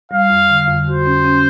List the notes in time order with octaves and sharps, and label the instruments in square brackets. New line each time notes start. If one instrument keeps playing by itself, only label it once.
[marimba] G3 [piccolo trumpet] F5
[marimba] F2
D3
F2
[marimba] F#4 [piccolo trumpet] C5
[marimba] C#4
C#4